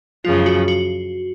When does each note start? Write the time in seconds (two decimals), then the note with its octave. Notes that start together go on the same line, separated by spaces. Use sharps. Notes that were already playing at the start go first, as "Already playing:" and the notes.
0.24 F3 F4
0.27 F#2 C#3
0.46 F#4
0.68 F#4